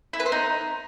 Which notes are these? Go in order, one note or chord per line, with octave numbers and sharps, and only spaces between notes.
E4
B4
C5
D#4